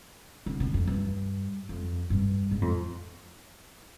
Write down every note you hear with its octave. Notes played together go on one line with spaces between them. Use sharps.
D3
D3
F2
G2
F2
G2
G#2
F2